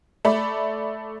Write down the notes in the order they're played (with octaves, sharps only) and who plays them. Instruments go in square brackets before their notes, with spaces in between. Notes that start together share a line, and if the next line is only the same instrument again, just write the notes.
[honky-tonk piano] A3 D5 B5